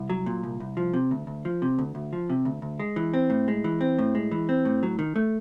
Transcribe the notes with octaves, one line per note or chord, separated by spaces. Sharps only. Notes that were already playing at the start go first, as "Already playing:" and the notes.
Already playing: C2
F#3
A#2
C2
C2
F3
C3
D2
D2
F3
C3
D2
D2
F3
C3
D2
D2
G#3
E3
C4
A2
G#3
E3
C4
A2
G#3
E3
C4
A2
F#3
D#3
A3